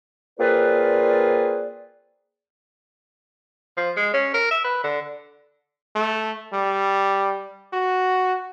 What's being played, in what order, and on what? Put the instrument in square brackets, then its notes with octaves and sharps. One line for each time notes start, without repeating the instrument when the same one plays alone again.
[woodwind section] A#3 C4 F4 G#4 B4 D5
[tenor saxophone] F3
G#3
C#4
A#4
E5
B4
D3
[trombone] A3
G3
F#4